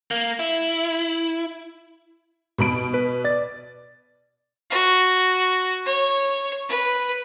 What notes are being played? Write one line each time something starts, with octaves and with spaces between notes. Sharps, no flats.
A#3
E4
B2 B5 D7
B4
D5 A6
F#4
C#5
B4